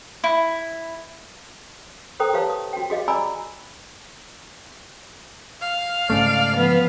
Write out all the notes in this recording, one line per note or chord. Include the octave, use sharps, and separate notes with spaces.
E4
A4 A#4 C5 G5 A#5 D#6
G4 B4 C#5 F5 A5
D#6
F#4 G5
F#4 G#4 D#5 F5
D5 G#5 A#5 B5 D6 E6
F5
G#2 C#3 A3 D5
F3 B3